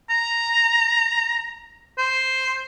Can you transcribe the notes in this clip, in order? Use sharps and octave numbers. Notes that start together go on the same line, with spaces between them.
A#5
C5